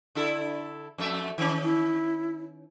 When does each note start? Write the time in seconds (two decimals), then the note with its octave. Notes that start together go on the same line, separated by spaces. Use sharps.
0.15 D3 E4 A4
0.98 F2 A3 E5
1.38 D#3 C#4
1.63 E4